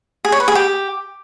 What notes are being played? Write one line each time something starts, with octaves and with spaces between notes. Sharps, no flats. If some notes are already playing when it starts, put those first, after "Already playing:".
G#4
C#5
B4
G#4
G4